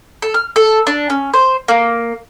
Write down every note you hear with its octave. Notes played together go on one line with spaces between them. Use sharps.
A4
F6
A4
D4
C#4
C5
A#3